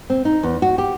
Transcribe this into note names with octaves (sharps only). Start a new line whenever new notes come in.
C4
D#4
E2
F#4
G4